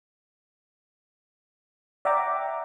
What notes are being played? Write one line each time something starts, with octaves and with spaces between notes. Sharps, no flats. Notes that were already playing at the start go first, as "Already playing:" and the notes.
D5 E5 F#5 G5 A#5 D6